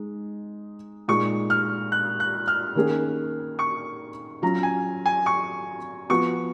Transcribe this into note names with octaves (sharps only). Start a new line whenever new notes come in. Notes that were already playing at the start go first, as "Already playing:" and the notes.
Already playing: G#3 D#4
A#2 G#3 D#4 C#6
F6
F#6
F#6
F6
D#3 A#3 C#4 G#4
C#6
F#3 C#4 F4 A#5
G#5
G#5
C#6
F3 B3 F#4 C#6